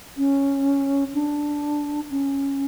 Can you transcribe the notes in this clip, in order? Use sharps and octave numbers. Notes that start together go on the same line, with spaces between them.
C#4
D4
C#4